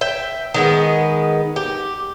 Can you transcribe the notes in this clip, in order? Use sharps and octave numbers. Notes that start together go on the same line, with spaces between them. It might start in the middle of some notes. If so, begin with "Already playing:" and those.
E5 G5
D#3 G#3 B3
G4